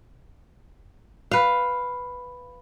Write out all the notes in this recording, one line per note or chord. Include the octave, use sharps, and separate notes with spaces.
B4 F5